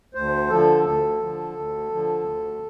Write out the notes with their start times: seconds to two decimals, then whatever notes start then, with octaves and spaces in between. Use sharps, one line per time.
0.14 D2 C5
0.49 D3 F3 A4
0.84 D2 A4
1.19 D3 F3
1.54 D2
1.89 D3 F3
2.24 D2